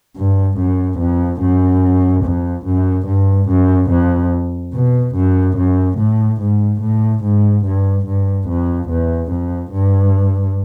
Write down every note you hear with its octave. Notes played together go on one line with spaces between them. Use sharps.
G2
F#2
F2
F#2
F2
F#2
G2
F#2
F2
B2
F#2
F#2
A2
G#2
A2
G#2
G2
G2
F2
E2
F2
G2